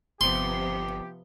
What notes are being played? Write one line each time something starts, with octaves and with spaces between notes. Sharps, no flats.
G1 C3 F3 B3 G4 C6